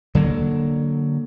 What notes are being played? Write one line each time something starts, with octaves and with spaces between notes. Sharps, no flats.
D3 F#3 A#3